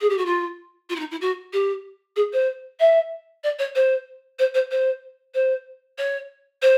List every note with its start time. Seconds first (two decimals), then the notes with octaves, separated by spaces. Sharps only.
0.01 G#4
0.09 G4
0.17 F#4
0.25 F4
0.89 F4
0.95 E4
0.99 D#4
1.11 E4
1.21 F#4
1.53 G4
2.16 G#4
2.33 C5
2.80 E5
3.43 D5
3.59 C#5
3.75 C5
4.39 C5
4.54 C5
4.71 C5
5.34 C5
5.98 C#5
6.62 C5